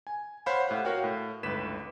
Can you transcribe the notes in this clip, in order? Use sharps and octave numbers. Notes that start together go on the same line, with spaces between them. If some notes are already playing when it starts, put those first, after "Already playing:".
G#5
C5 C#5 F5 F#5 B5
A2 G4 F5 F#5
F#4 A#4 C#5 F5 G5
A2
G1 C#2 A2 B4 B6 E7